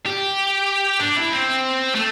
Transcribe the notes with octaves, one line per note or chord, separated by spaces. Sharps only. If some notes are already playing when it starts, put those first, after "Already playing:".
G4
D4
E4
C4
A3